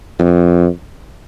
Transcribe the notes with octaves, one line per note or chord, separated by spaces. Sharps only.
F2